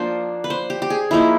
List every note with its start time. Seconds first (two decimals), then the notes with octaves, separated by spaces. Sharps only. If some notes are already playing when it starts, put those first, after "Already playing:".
Already playing: F3 A#3 D4 C5
0.44 B4
0.50 C5
0.70 G4
0.82 G4
0.90 G#4
1.11 F3 A#3 D#4 E4